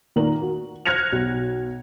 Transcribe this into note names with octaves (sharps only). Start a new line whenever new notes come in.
A#2 D#3 A#4 F#7
F#4
F6 F#6 G#6 A#6 C#7 F7
B1